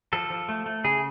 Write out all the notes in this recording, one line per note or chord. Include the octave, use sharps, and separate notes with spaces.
F3 A4
F3
A3
A3
C#3 G#4